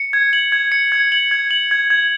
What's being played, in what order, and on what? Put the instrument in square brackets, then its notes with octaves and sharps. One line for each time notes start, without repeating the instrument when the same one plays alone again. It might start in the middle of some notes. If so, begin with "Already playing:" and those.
Already playing: [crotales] C#7
G#6
F#7
G#6
C#7
G#6
F#7
G#6
F#7
G#6
G#6